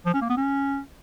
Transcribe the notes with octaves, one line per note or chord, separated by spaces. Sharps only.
F3
C#4
A#3
B3
C#4